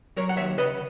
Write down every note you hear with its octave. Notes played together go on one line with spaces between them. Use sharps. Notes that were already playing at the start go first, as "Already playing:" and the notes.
F#3 A#4 C#5
F#5
D#2 C#5 E5
C#3 B4 D#5